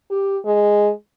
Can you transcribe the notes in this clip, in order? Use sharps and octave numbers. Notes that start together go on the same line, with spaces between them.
G4
G#3